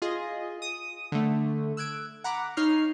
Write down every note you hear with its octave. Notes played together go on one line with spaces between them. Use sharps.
F4 G#4 D#5
D#6
D3 A3
E6 F#6 G#6 D7
F#5 A#5 B5 D6
D#4 C#5 F6 C7